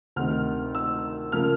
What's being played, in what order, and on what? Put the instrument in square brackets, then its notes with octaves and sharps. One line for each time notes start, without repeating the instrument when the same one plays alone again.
[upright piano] D2 C3 D#3 F6
E6
C#3 F3 A#3 F6